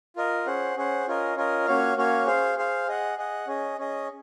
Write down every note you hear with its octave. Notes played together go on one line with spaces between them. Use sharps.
F4 A#4 D#5
C#4 G#4 C5 F#5
C#4 G#4 C5 F#5
C#4 F4 A#4 D#5
C#4 F4 A#4 D#5
A#3 C#4 F#4 C#5 F5
A#3 C#4 F#4 C#5 F5
G#4 C5 F5
G#4 C5 F5
G#4 D#5 F#5
G#4 D#5 F#5
C#4 G#4 D#5
C#4 G#4 D#5